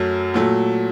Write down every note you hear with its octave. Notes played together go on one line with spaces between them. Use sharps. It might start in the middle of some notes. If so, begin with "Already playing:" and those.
Already playing: F#2 F#3 A3
A#2 F#3 A3